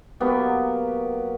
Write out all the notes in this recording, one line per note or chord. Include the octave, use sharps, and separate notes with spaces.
F#3 A#3 B3 G4